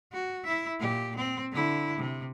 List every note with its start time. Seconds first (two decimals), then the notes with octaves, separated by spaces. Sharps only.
0.12 F#4
0.45 E4 E5
0.80 A#2 G4
1.16 C4
1.52 D3 E4
1.98 C3